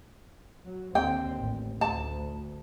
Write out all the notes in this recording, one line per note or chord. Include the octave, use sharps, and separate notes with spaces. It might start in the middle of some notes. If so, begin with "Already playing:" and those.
F#3
D#2 D3 C4 G5
A1
D2 A5